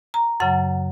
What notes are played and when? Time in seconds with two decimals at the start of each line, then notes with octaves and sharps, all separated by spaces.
0.14 A#5
0.40 F#2 C#3 F#3 F#5